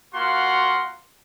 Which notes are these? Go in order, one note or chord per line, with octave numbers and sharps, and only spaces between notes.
A#3 F4 F#4 F5 F#5 C6